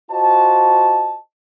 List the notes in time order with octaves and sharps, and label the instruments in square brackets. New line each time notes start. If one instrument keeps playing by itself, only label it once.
[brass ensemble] F4 F#4 C5 D#5 A5